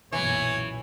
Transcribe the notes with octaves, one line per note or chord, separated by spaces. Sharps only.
B1 F#2 A#2 E3 C#5